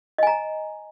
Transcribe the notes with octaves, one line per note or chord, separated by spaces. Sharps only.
D#5 G#5 A#5